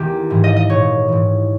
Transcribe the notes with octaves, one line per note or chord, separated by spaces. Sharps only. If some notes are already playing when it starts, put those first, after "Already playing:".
Already playing: E2 D#3 G4
G#2 E3
D#5
D#5
A#2 C#5
G#2 E3